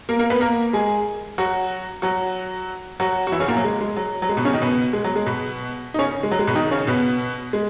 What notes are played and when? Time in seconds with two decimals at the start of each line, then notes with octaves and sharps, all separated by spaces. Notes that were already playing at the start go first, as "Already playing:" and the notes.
0.09 A#3 A#4
0.19 A#3 A#4
0.30 B3 B4
0.41 A#3 A#4
0.73 G#3 G#4
1.38 F#3 F#4
2.02 F#3 F#4
3.00 F#3 F#4
3.27 F#4
3.32 E3 E4
3.40 C#3 C#4
3.48 A#2 A#3
3.57 F#3
3.64 G#3
3.81 G#3
3.97 F#3
4.22 F#3
4.29 G#3
4.37 B2 B3
4.45 C#3 C#4
4.53 D#3 D#4
4.62 B2 B3
4.93 G#3
5.04 F#3
5.16 G#3
5.26 B2 B3
5.94 D#4
5.98 C#3 C#4
6.23 G#3
6.31 F#3
6.39 G#3
6.47 B2 B3
6.55 D#3 D#4
6.71 C#3 C#4
6.87 B2 B3
7.53 G#3